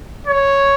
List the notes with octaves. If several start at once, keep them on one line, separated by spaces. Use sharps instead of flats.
C#5